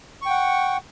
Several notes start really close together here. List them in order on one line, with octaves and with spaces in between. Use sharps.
C#6 G5 F#5